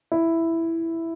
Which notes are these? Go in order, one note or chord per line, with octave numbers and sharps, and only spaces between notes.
E4